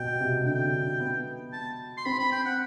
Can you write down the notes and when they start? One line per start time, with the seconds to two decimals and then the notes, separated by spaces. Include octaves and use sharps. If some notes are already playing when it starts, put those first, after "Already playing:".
Already playing: B2 G5
0.20 C3
0.46 D3 G5
1.00 B3
1.53 A5
1.97 C6
2.06 C4 B5
2.19 B5
2.32 G5
2.46 F#5